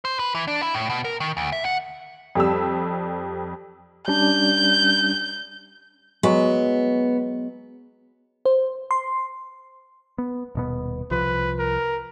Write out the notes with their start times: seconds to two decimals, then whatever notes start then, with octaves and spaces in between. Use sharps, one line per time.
0.05 C5
0.19 B4
0.35 E3
0.48 D4
0.62 E4
0.74 A2
0.89 B2
1.04 A#4
1.20 D#3
1.37 D2
1.52 E5
1.65 F#5
2.35 F2 G3 G4 E6
4.08 G3 C#4 D4 G6
6.23 F#3 G#3 B3
8.45 C5
8.91 C6
10.18 B3
10.55 D#1 B2 B3
11.11 C2 F3 B4
11.59 A#4